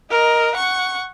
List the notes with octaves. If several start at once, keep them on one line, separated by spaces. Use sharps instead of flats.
A#4 D#5
F#5 C#6